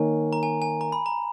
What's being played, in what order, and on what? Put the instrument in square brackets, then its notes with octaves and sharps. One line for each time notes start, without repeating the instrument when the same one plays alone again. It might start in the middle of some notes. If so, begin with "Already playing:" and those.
Already playing: [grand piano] D#3 A#3 D#4 A#4 C#5 [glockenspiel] G#5
[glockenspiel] A#5
G#5
G#5
A#5
B5
A#5